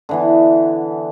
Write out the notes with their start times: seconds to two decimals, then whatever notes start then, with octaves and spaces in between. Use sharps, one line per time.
0.09 D3 E3 B3